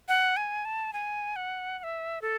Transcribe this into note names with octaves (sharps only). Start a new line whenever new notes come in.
F#5
G#5
A5
G#5
F#5
F#5
E5
A4